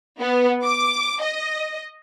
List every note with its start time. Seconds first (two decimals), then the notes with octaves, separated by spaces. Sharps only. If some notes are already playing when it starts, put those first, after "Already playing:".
0.19 B3
0.63 D6
1.21 D#5